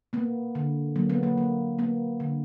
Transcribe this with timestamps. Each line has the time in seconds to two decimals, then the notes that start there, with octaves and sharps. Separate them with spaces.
0.13 A#3 B3
0.55 D3
0.96 F#3 A#3
1.10 B3
1.23 A#3
1.38 A#3
1.79 A#3 B3
2.20 D3